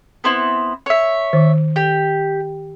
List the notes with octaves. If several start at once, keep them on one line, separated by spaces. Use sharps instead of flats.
B3 C4 E4
C#5 E5
D#3
G4